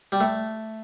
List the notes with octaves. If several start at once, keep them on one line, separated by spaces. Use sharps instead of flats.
G3
A3